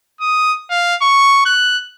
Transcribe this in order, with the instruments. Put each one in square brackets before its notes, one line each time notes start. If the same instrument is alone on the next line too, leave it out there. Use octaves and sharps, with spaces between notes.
[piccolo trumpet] D#6
F5
C#6
F#6